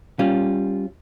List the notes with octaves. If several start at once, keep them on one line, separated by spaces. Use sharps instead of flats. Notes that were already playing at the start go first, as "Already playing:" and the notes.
G3 C#4 F4